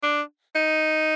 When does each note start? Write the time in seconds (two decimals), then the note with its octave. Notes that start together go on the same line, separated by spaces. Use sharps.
0.03 D4
0.56 D#4